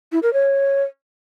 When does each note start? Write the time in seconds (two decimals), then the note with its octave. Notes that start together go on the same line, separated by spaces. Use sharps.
0.12 E4
0.23 A#4
0.33 C#5